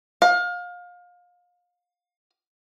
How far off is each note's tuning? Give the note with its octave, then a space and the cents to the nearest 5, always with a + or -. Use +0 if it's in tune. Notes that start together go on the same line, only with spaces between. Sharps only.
F5 +30